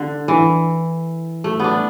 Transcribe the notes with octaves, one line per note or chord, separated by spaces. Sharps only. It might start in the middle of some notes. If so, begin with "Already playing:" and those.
Already playing: D3
E3
A3
B3 D4